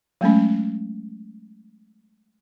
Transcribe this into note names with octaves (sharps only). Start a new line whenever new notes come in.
F#3 G#3 A3 C#4